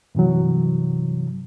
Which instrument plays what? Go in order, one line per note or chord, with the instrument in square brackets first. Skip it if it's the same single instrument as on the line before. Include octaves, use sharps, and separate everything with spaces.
[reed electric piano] G2 C3 E3 F#3